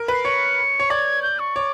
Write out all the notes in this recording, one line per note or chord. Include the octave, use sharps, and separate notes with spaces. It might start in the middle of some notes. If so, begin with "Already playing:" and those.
Already playing: A#4
B4 C7
C#5 C#7
C#5
D5 G#6
G6
C#6
C#5 D6